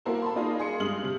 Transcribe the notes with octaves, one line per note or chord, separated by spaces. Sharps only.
A#3 E4 F#4 A4 A#4 C5
A5 B5 C6
A#3 D#4 F4 G#4 D5 D#5
G#4 C6 C#7
G2 G#3 D#6 F6 F#7
C3 C4